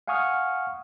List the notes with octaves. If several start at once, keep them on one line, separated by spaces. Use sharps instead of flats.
F5 F#5 G#5 C#6 D#6 F6